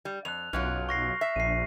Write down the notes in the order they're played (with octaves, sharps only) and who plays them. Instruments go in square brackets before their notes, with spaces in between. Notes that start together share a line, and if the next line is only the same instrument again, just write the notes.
[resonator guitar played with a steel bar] G3
[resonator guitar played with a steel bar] F2 [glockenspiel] F#6 F7
[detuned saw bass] B1 [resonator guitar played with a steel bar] F#2 F#3 F4 [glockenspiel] F6
[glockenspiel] C#6 A#6 C7
[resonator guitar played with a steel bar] E5
[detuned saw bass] A#1 [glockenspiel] C7 D#7